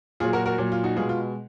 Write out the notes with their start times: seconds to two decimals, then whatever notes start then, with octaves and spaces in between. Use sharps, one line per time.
0.20 A#2 F#3 F4 G#4
0.33 F#4 A#4
0.46 F#4 A#4
0.58 A#2 F#3
0.72 F4
0.84 D#4 F#4
0.96 B2 G#3 F4 G#4
1.09 F4